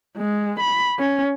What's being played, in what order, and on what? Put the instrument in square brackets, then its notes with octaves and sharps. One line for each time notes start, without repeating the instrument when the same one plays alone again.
[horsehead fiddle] G#3
B5
C#4